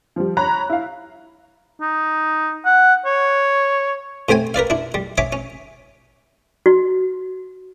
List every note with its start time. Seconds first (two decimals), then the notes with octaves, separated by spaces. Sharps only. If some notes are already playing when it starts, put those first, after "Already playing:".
0.16 F3 G3
0.37 C#5 A#5 B5 F#6
0.69 E4 F5
1.81 D#4
2.65 F#5
3.06 C#5
4.29 A2 C3 C4 G5 G#5
4.54 A#4 B4 D5 F5
4.70 D4 E4
4.94 G3
5.18 C#4 C#5 E5 D6
5.33 C#4
6.66 F#4